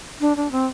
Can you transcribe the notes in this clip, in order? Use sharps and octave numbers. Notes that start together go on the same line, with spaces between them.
D4
D4
C4